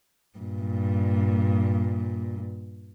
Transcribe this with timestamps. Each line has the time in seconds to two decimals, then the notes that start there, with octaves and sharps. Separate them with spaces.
0.38 G2 A#2